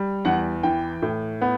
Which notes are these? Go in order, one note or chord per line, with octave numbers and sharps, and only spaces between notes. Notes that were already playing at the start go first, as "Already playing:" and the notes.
Already playing: G3
E2 F#5
E3 G5
A2
B3